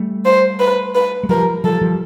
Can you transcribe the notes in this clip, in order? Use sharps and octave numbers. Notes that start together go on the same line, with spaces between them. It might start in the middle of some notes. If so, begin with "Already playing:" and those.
Already playing: G3 A3
C5
B4
B4
G#3
F3 G3 A#4
F3 G3 A4
F3 G3